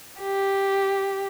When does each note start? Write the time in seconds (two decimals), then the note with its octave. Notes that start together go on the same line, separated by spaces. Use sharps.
0.20 G4